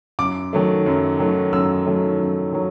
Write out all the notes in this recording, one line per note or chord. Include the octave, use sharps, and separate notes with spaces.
F#2 D6
D#3 F#3 A3
F#2
D#3 F#3 A3
F#2 E6
D#3 F#3 A3
F#2
D#3 F#3